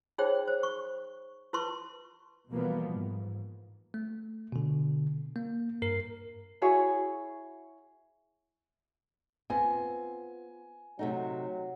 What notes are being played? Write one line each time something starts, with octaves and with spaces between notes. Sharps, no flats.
D#4 G#4 C5 C#5 G5
C5
C#6
E4 B4 A5 C6 C#6
B2 E3 F3 G3 A#3 B3
G#2
A3
B2 D3
A#3
G2 A#4 C7
E4 F#4 G#4 C#5
B3 C4 F4 G#5
C3 F#3 A3 D#4